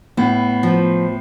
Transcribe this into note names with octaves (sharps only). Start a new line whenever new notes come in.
A2 B3
F3